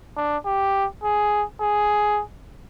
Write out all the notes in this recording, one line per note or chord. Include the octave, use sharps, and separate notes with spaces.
D4
G4
G#4
G#4